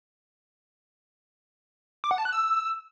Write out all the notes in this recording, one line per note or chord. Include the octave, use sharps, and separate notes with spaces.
D6
F#5
A5
F#6
E6